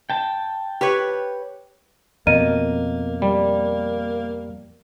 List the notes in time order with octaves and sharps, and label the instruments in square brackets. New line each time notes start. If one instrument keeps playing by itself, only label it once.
[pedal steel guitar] G5 A5
[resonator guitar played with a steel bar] G4 B4 C#5
[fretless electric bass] F2 B2 [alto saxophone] A#3 [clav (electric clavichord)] A#4 [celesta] D#5 D#7
[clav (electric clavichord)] G3